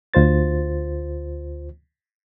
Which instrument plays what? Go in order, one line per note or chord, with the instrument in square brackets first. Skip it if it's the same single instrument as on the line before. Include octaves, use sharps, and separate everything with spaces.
[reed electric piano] D2 F4 C5 A6